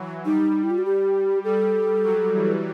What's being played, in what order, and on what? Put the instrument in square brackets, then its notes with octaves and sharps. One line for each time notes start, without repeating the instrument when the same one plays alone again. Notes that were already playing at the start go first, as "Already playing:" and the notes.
Already playing: [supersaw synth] E3 F#3
[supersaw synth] G3 [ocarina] D#4
[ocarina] E4
F4
F#4
G4
[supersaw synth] G3 [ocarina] A4
[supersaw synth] F#3
E3